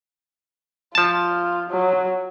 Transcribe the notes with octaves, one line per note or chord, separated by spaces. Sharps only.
F3 F4 A5
F#3